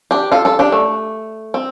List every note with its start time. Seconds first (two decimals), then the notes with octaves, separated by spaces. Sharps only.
0.11 D4 G4
0.32 F4 A4
0.45 F4 A4
0.59 D4 G4
0.72 A3
1.54 C4